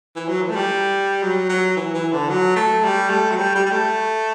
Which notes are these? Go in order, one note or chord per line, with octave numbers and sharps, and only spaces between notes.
E3
F#3
E3
A3
G3
F#3
F#3
E3
E3
D3
F#3
A3
G3
A3
F#3
G3
G3
G3
A3